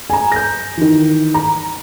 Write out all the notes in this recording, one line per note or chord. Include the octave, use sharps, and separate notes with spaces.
G#5 A#5
G6 A#6
D#3 E3
A#5